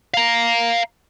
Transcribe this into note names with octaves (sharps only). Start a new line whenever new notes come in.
F5 A#5